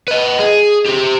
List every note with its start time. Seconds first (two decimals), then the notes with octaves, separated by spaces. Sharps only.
0.08 B4 D#5
0.39 G#4
0.86 C4 G4